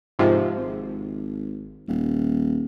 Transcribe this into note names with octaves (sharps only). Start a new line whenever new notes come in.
G#2 C3 F3
G#1
D#1